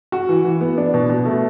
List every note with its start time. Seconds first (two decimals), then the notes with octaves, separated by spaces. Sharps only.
0.12 F#4
0.29 E3
0.44 E3
0.61 B3
0.78 D4
0.94 B2
1.10 B2
1.25 A3